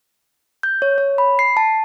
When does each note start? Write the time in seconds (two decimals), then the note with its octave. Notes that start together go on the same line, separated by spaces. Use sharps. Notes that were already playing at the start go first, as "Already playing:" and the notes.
0.63 G6
0.82 C#5
0.98 C#5
1.18 B5
1.39 C7
1.57 A5